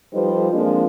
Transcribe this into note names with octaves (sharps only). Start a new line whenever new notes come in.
F3 G3 D#4 A4 B4 C5
F3 G#3 A#3 C4 D4 F4